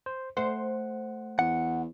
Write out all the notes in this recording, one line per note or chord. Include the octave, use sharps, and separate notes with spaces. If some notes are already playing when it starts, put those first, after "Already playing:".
C5
A3 C5 F#5
E2 F#5